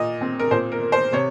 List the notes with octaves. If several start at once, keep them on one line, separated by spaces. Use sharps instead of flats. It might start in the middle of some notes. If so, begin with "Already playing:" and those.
Already playing: A#2 D#5
C4
A#4
A#2 C5
A#4
A#3
C5
C3 C#5